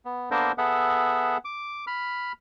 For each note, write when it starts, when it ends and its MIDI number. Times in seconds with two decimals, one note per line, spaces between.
0.05 0.31 59
0.31 0.52 58
0.31 0.52 59
0.31 0.52 62
0.31 0.52 69
0.31 0.52 70
0.31 0.52 72
0.58 1.37 59
0.58 1.37 68
0.58 1.37 69
0.58 1.37 76
0.58 1.37 78
1.45 1.85 86
1.87 2.32 83
1.87 2.32 89